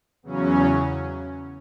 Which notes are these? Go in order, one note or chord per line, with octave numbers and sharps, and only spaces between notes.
E2 C#3 F#3 C#4